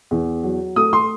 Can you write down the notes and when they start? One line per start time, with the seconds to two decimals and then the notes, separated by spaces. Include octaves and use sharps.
0.11 E2
0.43 F#3
0.76 A3 D#6
0.93 C6